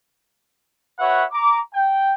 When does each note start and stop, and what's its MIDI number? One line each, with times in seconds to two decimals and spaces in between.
0.99 1.24 66
0.99 1.24 71
0.99 1.24 73
0.99 1.24 76
0.99 1.24 78
1.32 1.59 82
1.32 1.59 86
1.74 2.14 79